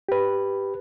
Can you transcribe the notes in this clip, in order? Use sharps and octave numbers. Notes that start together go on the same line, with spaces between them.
G4 B4